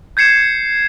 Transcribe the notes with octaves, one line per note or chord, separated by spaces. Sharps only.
G6 G#6 C7 C#7 E7